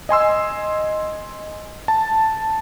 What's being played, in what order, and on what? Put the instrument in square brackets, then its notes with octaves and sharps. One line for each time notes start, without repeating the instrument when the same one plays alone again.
[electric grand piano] D#5 G#5 C6 E6
A5